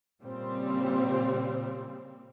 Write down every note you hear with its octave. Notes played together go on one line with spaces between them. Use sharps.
A#2 C#3 G3 C4